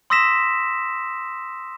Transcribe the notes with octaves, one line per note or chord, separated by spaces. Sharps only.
C6 D#6 E6 A#6 B6 E7